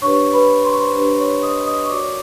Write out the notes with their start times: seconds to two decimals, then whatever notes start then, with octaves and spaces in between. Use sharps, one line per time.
0.02 D4 G4 B4 C#5 C#6
0.33 B4 B5
0.65 C6
0.72 C#6
0.79 C5 C6
0.96 D4 G4 B4
1.19 C#5 C#6
1.43 D#5 D#6
1.66 D#5 D#6
1.84 C#6
1.89 F#4 A#4 C#5 D5 D6